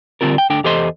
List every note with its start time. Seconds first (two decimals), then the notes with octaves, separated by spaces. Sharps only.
0.21 D3 G3 C4 F4 A#4
0.38 G5
0.50 D2 D3 D4 G5
0.64 E2 G4 A4 C5 D#5 C6